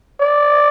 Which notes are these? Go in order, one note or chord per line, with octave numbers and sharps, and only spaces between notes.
D5